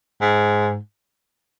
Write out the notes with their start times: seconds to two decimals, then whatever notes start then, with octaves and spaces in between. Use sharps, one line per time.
0.21 G#2